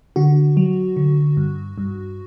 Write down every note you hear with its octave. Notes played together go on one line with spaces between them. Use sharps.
D3 F#4
F#3
D3
G2
G2